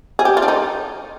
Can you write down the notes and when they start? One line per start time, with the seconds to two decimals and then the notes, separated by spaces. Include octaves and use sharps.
0.19 G#4
0.25 G4
0.37 F4
0.42 D4
0.48 D#4